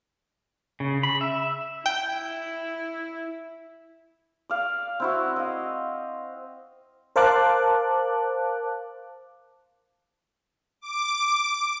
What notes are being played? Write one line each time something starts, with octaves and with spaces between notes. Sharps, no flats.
C#3
B5
E5
E4 G5
D5 F5
C4 E4 F#4
D#5 F5
A#4 C5 F5 A5 D6 F#6
D6